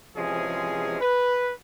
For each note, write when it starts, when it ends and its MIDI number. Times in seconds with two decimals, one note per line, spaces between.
0.16 1.01 48
0.16 1.01 52
0.16 1.01 53
0.16 1.01 56
0.16 1.01 61
0.16 1.01 68
1.01 1.52 71